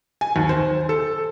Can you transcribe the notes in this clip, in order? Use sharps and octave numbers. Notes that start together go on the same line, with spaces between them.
G#5
D#2
C5
A4